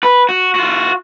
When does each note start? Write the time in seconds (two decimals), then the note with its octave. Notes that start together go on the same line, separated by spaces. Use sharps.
0.03 B4
0.29 F#4
0.55 F4 F#4